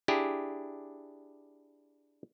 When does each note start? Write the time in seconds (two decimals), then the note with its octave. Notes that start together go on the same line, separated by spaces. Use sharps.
0.08 D4 E4 G4 G#4